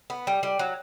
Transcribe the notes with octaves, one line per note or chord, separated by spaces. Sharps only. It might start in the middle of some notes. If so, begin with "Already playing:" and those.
B3
G3
G3
F#3